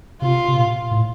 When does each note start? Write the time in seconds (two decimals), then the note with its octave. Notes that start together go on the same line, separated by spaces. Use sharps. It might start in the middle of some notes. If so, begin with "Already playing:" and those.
0.22 C3 F4
0.48 C3
0.56 A#2
0.91 A2